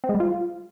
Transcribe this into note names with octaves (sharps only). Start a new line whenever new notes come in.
C4
G#3
G3
F4